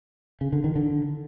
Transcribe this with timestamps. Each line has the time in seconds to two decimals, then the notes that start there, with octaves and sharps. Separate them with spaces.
0.41 C#3
0.53 D3
0.64 D#3
0.76 D3